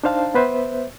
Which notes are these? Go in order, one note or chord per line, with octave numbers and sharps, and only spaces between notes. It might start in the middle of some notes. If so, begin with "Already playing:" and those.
D4 D#4 C5 F5 A5
B3 B4 C5 E5